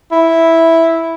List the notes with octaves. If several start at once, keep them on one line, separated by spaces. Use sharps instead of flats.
E4